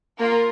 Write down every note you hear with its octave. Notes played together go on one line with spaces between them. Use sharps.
A#3 F4 A#4